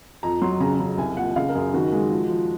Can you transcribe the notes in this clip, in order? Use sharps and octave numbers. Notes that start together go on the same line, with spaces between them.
F2 A#5
F#3 C6
C#3 A#5
C#3
C2 G#5
A#2 F#5
C#3 F5
A#4
F#2 G#4
D#3 F#4
G#3
F3
F3